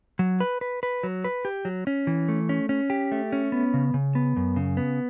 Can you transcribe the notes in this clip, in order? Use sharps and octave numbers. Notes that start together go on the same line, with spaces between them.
F#3
B4
B4
B4
F#3
B4
G4
F#3
C#4
E3
A3
C#4
C#4
G4
A3
C#4
B3
C#3
C#3
B3
F#2
C#3
B3